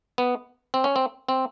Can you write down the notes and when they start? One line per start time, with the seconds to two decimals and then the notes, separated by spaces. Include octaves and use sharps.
0.18 B3
0.74 C4
0.84 C#4
0.96 C4
1.29 C4